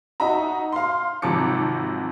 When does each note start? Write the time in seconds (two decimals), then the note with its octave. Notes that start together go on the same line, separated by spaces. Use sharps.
0.20 D#4 F#4 E5 A#5
0.72 F5 C6
1.22 G#1 C3 F3 F#3 D6 C#7